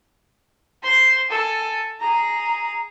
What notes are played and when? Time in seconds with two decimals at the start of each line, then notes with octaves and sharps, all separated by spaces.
0.83 C5 C6
1.30 A4 G#5
2.00 G#4 A#5